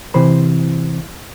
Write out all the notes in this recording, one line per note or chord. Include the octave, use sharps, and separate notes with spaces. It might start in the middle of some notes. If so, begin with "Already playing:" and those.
C3 E3 C5 B5